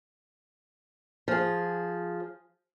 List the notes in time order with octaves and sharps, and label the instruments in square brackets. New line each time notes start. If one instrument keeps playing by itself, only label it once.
[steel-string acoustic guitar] F3 G#4